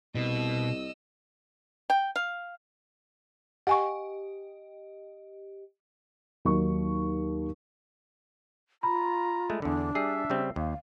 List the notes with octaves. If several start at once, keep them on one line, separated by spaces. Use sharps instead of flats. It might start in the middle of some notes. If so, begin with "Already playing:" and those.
C2 B2 D#5 E6
G5
F5
G4 D#5 F#5 G#5 C#6
D#2 F#3 D#4 C#6
F4 A#5 B5
G#3 A3
E2 D3 D4
G3 G#4 E5 C7
C#3 G3 C4
D#2 F5